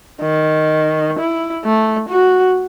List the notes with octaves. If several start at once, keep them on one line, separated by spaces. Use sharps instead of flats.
D#3
E4
A3
F#4